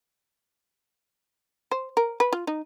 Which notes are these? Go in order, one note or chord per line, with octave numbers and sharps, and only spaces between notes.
C5
A#4
B4
F4
D#4